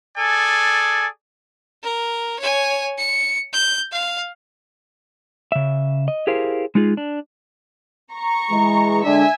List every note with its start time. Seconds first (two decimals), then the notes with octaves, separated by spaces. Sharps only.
0.18 G#4 A4 D5 G#5
1.83 A#4
2.39 C#5 G#5
2.98 C#7
3.53 G6
3.92 F5
5.52 C#3 E5
6.08 D#5
6.27 E4 G4 G#4 A#4 C5 F5
6.75 G#3 D#4 F4 G#4
6.97 D4
8.12 A#5 C#6
8.51 E3 G#3
9.04 D3 G#3 D4 E5 G#5